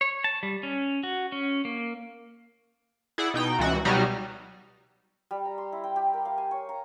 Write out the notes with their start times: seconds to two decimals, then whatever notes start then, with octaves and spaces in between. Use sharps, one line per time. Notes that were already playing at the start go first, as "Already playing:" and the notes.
0.01 C#5
0.24 A5
0.43 G3
0.63 C#4
1.03 F#4
1.32 C#4
1.65 A#3
3.18 E4 G#4 D5 F#5
3.34 B2 D#4 G5
3.59 C#2 E3 F#4
3.85 B2 F#3 G3 D#4 F#4 F6
5.31 G3
5.45 A#5
5.58 C6
5.72 E4
5.84 G5
5.96 G4
6.13 A#4
6.25 F5
6.38 G#5
6.51 C#5
6.69 A#5